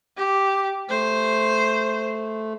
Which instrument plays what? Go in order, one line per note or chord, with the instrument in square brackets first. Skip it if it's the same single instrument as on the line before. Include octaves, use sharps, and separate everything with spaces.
[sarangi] G4
[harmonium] A3 [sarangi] C5